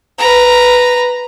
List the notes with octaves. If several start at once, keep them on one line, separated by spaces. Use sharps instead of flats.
B4 A#5